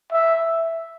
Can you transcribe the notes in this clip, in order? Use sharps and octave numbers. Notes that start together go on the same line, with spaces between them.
E5